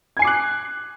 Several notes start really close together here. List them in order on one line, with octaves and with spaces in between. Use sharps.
G#6 G#5 C7 D6 F#6